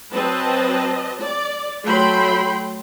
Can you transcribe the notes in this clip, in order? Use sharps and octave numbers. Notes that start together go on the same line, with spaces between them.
F#3 C4 B4 D#5 A5
D5
F#3 A3 G5 B5 C6